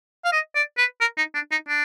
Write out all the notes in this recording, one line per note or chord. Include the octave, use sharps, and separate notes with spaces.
F5
D#5
D5
B4
A#4
D#4
D4
D#4
D4